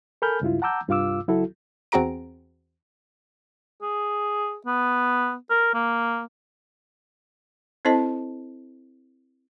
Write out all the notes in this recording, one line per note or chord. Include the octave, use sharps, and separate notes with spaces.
A4 A#4 G#5 B5 F6 G6
C#2 G2 E4 F4
F#5 A5 A#5 D6 E6 G6
C2 G2 F4 F5 D6 E6
C#2 F#3 E4 F#4 A4
E2 C4 F#4 G#4 A#5 D7
G#4
B3
A#4
A#3
C4 E4 A4 C5 D#5 A5